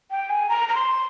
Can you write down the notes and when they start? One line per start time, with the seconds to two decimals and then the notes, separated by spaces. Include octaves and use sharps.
0.11 G5
0.30 G#5
0.49 A#5
0.69 A#5
0.75 C6